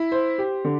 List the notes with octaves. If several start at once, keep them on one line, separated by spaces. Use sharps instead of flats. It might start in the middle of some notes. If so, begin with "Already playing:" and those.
Already playing: E4
C5
G4
D3